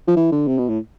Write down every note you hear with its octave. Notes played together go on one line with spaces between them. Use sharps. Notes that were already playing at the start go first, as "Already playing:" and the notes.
F3
E3
D3
C3
B2
A2